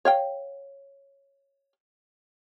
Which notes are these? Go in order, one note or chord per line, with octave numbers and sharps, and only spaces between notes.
C#5 F5 G5